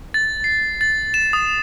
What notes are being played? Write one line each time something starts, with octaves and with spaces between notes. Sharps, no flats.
A6
C7
A6
E7
D#6